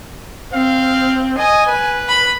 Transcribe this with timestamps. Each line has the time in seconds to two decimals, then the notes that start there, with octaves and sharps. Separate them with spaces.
0.53 C4 F5
1.37 D#5 G#5
1.67 B4
2.09 B5